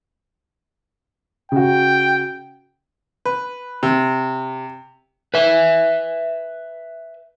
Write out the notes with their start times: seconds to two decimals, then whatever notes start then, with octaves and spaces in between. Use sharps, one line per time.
1.52 C#3 F#4 G5
3.25 B4
3.83 C3
5.34 B4 E5